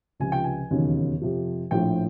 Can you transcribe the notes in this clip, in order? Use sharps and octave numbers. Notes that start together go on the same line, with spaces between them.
C#2 C3 F3 G#5
G5
G#5
E1 D#2 C#3 F#3
F2 C3 F3
A#1 A2 F3 G5